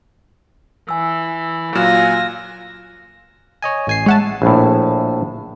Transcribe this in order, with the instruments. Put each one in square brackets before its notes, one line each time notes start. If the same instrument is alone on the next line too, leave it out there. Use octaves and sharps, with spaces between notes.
[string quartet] E3 [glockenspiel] G#5 E6
[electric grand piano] A#2 F#3 [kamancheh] F4 G#5 [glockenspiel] F6 F#6 E7 [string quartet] A#6
[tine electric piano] C#5 D#5 G#5
A1 G#5 C7
[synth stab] G#3 F#5 A5 [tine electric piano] C#5 E5
[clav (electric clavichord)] A#1 A2